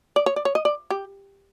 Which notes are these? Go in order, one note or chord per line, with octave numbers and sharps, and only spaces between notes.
D5
C#5
D5
C#5
D#5
D5
G4